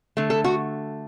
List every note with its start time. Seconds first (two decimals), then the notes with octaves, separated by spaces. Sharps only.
0.17 D3 A3
0.30 A4
0.44 F#4